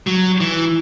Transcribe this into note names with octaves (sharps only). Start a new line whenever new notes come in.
F#3
E3